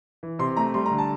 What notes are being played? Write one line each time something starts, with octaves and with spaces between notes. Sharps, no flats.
E3
C3 C6
A3 A#5
G3 C6
A#5
D3
A5